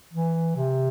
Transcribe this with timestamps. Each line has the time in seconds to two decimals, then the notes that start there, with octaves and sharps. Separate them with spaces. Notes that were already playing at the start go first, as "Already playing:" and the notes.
0.13 E3
0.56 C3